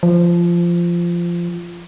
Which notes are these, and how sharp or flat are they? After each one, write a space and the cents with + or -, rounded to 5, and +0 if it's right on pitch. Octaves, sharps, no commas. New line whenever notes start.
F3 -15